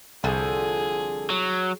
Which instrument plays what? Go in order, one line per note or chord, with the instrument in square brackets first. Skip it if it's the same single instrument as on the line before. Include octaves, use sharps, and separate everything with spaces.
[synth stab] C2 [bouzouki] D3 F3 [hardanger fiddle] G#4
[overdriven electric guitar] F#3